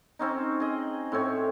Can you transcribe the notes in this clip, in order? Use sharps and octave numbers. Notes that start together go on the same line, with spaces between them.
C4 C#4 D#4
G#4 D#5
A2 C4 C#5